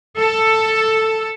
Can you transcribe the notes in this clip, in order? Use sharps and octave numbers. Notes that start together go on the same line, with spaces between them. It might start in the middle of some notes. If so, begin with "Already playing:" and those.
A4